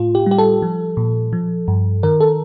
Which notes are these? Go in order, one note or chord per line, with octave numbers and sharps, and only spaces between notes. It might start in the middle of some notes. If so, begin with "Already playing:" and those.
Already playing: A2 F4
G4
G3 G4
A4
F3
A#2
F3
G2
D#3 A#4
A4